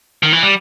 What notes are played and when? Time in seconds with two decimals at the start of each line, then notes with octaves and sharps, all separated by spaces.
0.23 D#3
0.33 E3
0.43 G3